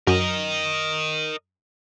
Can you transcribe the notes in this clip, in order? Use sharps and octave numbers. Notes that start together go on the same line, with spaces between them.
F#2 A#4 D#5